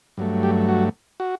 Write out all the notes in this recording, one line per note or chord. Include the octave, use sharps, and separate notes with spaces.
G2 F#3 A3
G4
F#4
F#4